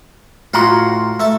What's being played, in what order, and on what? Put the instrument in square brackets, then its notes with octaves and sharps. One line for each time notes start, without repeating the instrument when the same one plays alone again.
[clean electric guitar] A2 A#5 C6 [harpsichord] F4 F#4 F#5
[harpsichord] A3 E5 A5